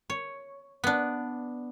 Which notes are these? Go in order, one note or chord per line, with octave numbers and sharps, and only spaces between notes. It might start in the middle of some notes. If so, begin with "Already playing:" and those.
C#5
B3 D4